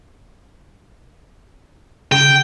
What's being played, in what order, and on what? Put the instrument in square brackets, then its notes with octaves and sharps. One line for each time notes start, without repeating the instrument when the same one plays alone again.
[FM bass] C#3 [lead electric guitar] G5